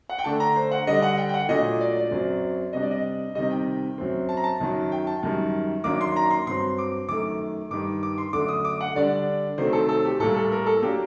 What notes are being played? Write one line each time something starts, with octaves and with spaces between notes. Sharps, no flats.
F#5
G5
D3 A3 D4 A5
A#5
C5
F#5
D3 G3 D4 D#5
F#5
G5
G5
F#5
A#2 F#3 A3 D4 D#5
D5
D5
F#2 F#3 C4
C3 G3 D4 D#5
D5
D#5
C3 D#3 G3 D#5
G5
F#2 F#3 C4
A5
A#5
A5
F#2 D#3 F#3
G5
A5
F#2 D#3 G3
F#2 D#3 F#3 A#3 D4 D6
C6
A#5
C6
G2 F#3 C4 C6
D6
F#2 D#3 A3 D6
G2 D#3 G3 D6
D6
C6
F#2 D3 A3 D4 D6
D#6
D6
F#5
D3 G3 D4 D5
C3 D#3 F#3 A3 C4 C5
A4
A4
G4
A2 G3 A#3 A4
A4
A#4
A4
F#3 A#3 D4 G4